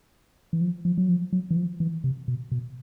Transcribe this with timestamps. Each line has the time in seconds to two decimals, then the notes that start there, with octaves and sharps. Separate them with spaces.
0.53 E3
0.61 F3
0.85 F3
0.98 F#3
1.09 F3
1.33 F#3
1.51 E3
1.56 F3
1.80 E3
2.04 C3
2.28 B2
2.52 B2